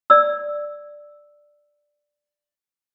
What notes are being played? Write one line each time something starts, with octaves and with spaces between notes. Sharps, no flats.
D5 E6